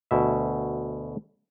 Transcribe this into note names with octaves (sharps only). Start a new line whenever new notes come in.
D2 B2 E5